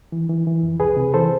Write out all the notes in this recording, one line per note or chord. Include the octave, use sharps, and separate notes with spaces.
E3
E3
E3
F2
C2 G#4 B4
C3
E3 A4 C5